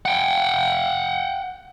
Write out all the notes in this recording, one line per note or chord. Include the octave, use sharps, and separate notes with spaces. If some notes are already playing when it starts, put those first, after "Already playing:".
F#5 G5